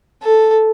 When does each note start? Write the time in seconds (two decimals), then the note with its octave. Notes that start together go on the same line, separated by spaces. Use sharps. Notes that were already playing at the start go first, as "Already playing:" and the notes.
0.22 A4